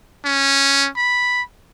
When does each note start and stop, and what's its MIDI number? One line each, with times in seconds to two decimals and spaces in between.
0.25 0.88 61
0.96 1.42 83